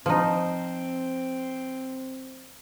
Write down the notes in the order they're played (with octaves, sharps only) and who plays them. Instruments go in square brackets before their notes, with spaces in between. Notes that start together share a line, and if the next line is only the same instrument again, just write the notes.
[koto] F3 D#4 [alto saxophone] C4